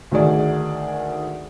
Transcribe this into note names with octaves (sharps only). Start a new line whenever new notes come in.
D2 D#3 G#4 D5